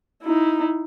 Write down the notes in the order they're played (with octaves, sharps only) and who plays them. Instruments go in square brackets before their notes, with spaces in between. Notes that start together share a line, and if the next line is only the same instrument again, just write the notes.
[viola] D#4 E4